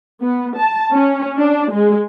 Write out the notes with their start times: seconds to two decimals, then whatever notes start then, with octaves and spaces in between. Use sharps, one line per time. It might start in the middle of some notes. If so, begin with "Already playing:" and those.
0.22 B3
0.57 A5
0.94 C#4
1.38 D4
1.72 G#3